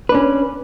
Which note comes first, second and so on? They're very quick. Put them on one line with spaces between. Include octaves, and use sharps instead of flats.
B4 D4 C#4